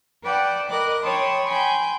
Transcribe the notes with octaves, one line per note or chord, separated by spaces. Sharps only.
B4 D5 F#5 G5 A5
A#4 D#5 B5 D6 F#6
C#5 G5 A5 B5 C6 D#6
G5 G#5 B5 C6 G6